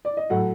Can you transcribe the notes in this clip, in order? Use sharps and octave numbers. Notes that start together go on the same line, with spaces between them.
D5
D#5
A2 F#3 A3 F#5